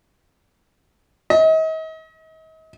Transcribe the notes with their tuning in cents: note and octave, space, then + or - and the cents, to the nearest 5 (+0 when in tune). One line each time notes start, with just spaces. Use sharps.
D#5 +40